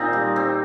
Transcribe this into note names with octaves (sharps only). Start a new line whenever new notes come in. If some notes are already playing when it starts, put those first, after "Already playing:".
Already playing: A#2 D#3 C4 D#4
G3
C4